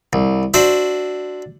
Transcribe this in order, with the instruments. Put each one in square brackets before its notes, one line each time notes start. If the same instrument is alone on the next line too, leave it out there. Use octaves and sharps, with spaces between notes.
[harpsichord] C2
D4 F#4 C5 E5